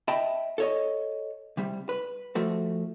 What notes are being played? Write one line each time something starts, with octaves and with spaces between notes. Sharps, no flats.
D#5 E5 G5 A5 B5
A4 C#5 D#5
C3 G3
B4
F3 A3 F#4